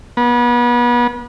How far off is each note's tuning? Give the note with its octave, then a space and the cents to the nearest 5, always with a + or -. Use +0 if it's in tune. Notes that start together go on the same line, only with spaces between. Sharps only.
B3 -35